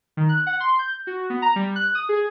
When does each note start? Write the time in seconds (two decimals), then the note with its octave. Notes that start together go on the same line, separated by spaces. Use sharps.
0.17 D#3
0.29 F#6
0.47 F#5
0.60 C6
0.79 G6
1.07 F#4
1.30 B3
1.42 A#5
1.56 G3
1.76 F#6
1.95 D#6
2.09 G#4